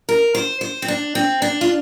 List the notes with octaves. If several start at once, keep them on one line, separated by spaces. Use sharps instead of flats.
A#4
C5
C5
C4
D4
C4
D4
F4